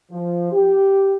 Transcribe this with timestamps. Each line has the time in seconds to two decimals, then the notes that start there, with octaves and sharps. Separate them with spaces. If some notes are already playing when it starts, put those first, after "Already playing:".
0.11 F3
0.52 G4